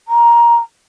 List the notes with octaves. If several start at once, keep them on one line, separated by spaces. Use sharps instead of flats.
A#5